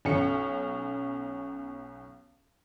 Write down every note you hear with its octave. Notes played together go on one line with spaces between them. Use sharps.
B1 C#4 C#7